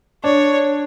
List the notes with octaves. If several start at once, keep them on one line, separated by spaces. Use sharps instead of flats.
D4 C#5